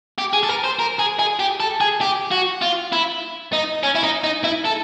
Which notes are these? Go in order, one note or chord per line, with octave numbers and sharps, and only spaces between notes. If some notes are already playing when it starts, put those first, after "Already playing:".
G4
G#4
A4
A#4
C5
A#4
G#4
G#4
G4
A4
G#4
G4
F#4
F4
E4
D#4
C#4
E4
D#4
D#4
E4
A4